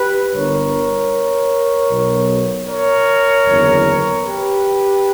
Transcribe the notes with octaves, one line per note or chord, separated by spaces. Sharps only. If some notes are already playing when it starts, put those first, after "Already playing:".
Already playing: G4 B4
G1 G2 D3 A#4 C#5
B1 B2
A#4 C#5
F#1 E2 D3
G4 B4